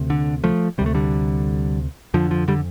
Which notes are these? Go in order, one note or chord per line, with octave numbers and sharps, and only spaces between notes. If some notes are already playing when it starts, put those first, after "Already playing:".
Already playing: D2 C3
D3
F3 A3
D2 C3 G3
A3
D3 G3
F2 D3 F3
F3
D3 G3